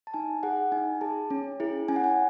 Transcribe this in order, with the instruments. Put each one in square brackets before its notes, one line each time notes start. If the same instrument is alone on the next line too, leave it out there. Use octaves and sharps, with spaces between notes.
[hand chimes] A5
D#4 G#5
G#4 F#5
D#4 G#5
G#4 A5
C#4
E4 G#4
C#4 G#5
F#5
G#5